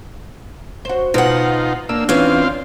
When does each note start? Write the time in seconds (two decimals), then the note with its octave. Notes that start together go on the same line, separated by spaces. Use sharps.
0.85 F#4 C5
1.14 B2 D#4 F4 F#5
1.89 A#3 D4 E6
2.09 E3 C4 C#4 F4 F5